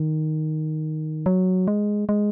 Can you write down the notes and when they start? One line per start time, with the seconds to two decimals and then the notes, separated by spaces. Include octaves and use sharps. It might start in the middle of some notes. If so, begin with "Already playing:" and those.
Already playing: D#3
1.26 F#3
1.68 G#3
2.09 G#3